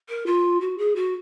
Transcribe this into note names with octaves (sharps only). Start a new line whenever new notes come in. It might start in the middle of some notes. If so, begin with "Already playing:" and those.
A#4
F4
F#4
G#4
F#4